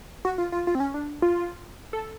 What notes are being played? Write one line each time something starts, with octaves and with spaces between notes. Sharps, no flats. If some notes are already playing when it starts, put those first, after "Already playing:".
F#4
F4
F4
F4
C4
C#4
D4
F4
A4